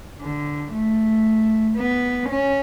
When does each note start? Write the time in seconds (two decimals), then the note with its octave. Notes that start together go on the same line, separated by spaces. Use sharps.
0.21 D3
0.73 A3
1.77 B3
2.29 C#4